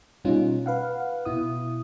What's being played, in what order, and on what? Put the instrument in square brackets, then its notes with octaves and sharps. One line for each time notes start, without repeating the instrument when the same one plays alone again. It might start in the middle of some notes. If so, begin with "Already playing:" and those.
[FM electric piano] B2 G3 C#4 D#4 F4
B4 F5 F#5
B2 E4 D#6